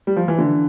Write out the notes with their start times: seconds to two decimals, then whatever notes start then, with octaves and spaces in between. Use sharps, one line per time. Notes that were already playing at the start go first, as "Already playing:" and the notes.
0.07 G3
0.16 F3
0.28 E3
0.39 D3